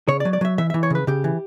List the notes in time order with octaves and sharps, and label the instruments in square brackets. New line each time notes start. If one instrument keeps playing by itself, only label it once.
[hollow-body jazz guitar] C#3 C#5
D5
F#3
D5
F#3 E5
E3 E5
E5
E3
C#5
C#3 B4
C#3 G4
E3